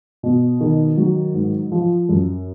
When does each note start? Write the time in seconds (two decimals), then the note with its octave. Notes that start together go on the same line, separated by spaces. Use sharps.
0.23 B2
0.61 D#3
0.97 F#3
1.34 G#2
1.72 F3
2.09 F#2